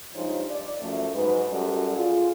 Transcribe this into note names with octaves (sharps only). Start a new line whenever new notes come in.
G2 F3 G#3 D#4 C5 C#5
D5
F#2 F3 A3
G#2 F#3 G#3 D#4 B4
F#2 G3 F#4 G4 A4 D5
F4 G#4